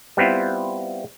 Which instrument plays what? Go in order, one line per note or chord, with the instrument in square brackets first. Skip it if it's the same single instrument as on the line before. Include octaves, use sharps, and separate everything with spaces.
[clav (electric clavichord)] G3 B3 C4 E4 F4